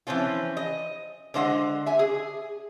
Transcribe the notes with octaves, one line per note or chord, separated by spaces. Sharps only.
E3 F3 C4 C#4 F4
D#5
D3 G#3 C5 D#5 E5 F#5
E5 G#5
G#4